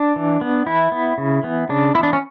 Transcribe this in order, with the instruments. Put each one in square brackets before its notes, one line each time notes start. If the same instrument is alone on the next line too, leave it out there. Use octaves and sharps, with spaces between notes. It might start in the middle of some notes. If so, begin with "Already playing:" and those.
Already playing: [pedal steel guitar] D4
E3
B3
E3 E4
B3
C#3
E3 B3
C#3 D4
B3 E4
E3 D4
C#4